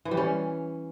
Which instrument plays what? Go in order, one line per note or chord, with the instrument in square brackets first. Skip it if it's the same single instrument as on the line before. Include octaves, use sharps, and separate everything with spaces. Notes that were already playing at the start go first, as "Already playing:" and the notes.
[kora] E3
G3
C#4